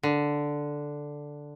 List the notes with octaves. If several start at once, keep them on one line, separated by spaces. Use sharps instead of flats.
D3